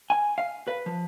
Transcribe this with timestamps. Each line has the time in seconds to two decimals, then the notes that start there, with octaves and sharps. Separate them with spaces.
0.10 G#5
0.38 F5
0.68 B4
0.86 F3